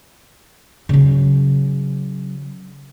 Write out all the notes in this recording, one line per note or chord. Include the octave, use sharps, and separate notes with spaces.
C#3 F#3